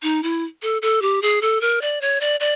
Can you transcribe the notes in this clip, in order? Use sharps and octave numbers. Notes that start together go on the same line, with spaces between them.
D#4
E4
A4
A4
G4
G#4
A4
A#4
D5
C#5
D5
D5